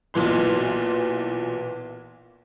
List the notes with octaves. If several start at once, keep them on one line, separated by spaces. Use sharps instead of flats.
B1 A#2 E3 C6